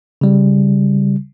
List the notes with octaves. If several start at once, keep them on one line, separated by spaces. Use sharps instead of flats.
C#3 G3